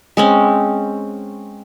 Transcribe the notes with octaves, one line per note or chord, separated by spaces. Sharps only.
G#3 C4 C#4